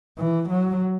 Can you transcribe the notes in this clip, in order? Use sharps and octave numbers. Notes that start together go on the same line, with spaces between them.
E3
F#3